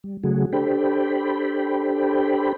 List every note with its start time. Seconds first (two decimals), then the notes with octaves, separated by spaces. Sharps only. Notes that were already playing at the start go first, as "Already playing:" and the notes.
0.04 G3
0.23 C#3 F#3 A3 F#4 G#4
0.53 D4 G4 A4 C5 G5 B5